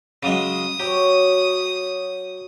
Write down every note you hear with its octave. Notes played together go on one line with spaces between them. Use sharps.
C#3 F#3 G#3 D#6
F#3 G4